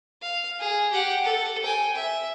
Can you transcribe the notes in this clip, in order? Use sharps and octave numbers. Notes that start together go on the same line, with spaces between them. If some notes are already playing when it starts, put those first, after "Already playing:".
F5
G#4
G4 F#5
A4
G5 G#5
E5